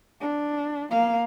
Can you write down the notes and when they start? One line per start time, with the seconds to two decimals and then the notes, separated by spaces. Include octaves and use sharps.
0.21 D4
0.91 A#3 F5